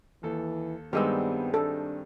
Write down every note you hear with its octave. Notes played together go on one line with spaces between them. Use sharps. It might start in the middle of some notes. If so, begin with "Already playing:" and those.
D#2 E3 A4
G2 D#3 G3 G#3 B3 C4 E6
D4 A4